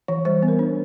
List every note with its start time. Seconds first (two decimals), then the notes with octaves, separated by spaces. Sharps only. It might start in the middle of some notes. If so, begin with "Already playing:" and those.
0.08 E3 C#5
0.25 G3 C5
0.43 B3
0.48 A#4
0.59 D4